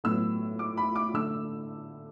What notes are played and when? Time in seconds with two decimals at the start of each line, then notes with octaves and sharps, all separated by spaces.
0.04 A2 F#3 B3 E6
0.59 D6
0.77 B5
0.96 D6
1.14 D3 A3 E6